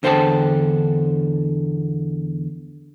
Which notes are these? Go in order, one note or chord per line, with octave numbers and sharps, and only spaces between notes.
E2 D3 C5 E5 G5 A5